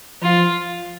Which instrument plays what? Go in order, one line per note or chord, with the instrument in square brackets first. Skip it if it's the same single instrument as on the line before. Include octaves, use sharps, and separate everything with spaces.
[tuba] F3 [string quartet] F4